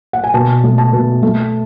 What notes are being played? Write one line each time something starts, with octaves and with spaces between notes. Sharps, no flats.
F#5
G#5
B2 A5
A3
A5
B2
A3